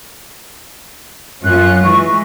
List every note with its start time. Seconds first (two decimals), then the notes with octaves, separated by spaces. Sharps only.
1.44 F#2 C#4 F4 F#6
1.84 E3 G#3 C#6